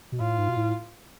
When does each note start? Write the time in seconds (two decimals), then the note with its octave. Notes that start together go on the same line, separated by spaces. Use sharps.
0.12 B2
0.20 A2 F4
0.38 G#2
0.48 B2
0.57 A2